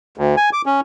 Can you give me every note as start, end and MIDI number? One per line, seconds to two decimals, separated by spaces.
0.18 0.36 38
0.37 0.50 80
0.53 0.62 86
0.66 0.80 61